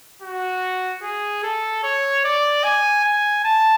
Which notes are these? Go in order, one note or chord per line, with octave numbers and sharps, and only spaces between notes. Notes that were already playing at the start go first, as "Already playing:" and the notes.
F#4
G#4
A4
C#5
D5
G#5
G#5
A5